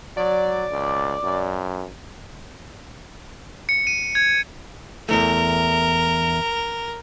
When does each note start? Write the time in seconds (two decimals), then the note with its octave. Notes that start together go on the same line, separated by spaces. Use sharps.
0.17 F#3 D5
0.71 C#2
1.24 F#2
3.69 C#7
3.87 D#7
4.15 G#6
5.09 E2 E3 A3 A#4